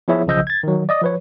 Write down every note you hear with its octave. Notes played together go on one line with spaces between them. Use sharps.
F3 B3 E4 G#4 C#5 E5
B1 C#3 F3 D#5 E6 G6
G#6 A6
D#3 F#3
D5 D#5 D#6
F3 B4 C#5